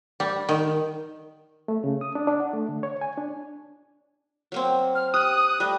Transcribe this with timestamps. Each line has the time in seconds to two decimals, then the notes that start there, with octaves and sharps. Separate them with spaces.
0.20 G3
0.49 D#3
1.68 A3
1.84 C#3
2.01 D#6
2.15 D4
2.27 D4
2.40 F#5
2.53 A3
2.69 D3
2.83 C#5
3.01 G#5
3.18 D4
4.52 F#3 A#3 C4
4.95 F6
5.14 G4 D#6 F#6
5.60 G3 A3 D#5